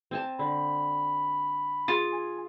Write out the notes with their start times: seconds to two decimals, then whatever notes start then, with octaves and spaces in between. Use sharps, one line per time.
0.11 C4 G#5 A5
0.39 D3 B5
1.88 F4 G#4
2.13 G#5